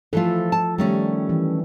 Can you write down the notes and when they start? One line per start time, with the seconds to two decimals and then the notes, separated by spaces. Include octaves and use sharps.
0.13 E3 F3 A3 F4 A4
0.52 A5
0.78 D#3 G3 A3 C#4
1.29 E3